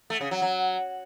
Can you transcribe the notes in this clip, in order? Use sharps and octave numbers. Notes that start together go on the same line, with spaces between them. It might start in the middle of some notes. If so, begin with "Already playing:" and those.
A3
C#3
F#3
F#3